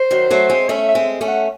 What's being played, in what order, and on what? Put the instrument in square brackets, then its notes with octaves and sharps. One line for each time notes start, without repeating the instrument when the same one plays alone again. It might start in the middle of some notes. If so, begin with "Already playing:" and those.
Already playing: [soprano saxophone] C5
[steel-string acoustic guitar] D#3 F#3
F#3 A3
G#3 C4
[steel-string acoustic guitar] A3 C#4 [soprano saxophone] E5
[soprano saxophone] E5
[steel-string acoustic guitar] G#3 C4
A3 C#4
[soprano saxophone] F#5